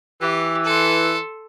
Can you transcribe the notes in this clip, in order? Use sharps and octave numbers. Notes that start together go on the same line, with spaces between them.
E3 G4
A4 C6